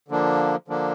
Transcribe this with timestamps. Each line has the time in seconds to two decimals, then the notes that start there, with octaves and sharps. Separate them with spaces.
0.08 D3 F3 A#3 D4
0.68 D3 F3 A#3 D4